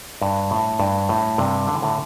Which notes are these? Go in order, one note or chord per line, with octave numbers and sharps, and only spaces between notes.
G2
A2
G2
A2
G2 C3
D3
E3
A2 D3